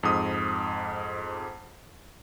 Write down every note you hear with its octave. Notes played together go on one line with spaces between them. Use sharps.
F2 G#2 D#6